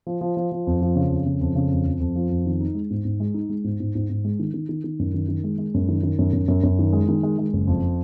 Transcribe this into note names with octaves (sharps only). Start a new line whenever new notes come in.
F3
F3
F3
F3
F2
F3
C#3
F2
C#3
F2
C#3
F2
F2
F2
F3
F2
D#3
D#4
G#3
G#2
G#2
G#3
D#4
G#3
G#2
G#2
G#2
G#2
G#3
D#3
D#3
D#3
D#3
F#2
D#3
D#3
G#3
G#3
F#2
D#3
D#3
F#2
F#2
F#2
F#2
D#3
G#3
D#3
G#3
G#3
F#1
F2